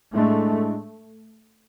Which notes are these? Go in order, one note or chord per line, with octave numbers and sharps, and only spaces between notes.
A2 G#3 A3 D4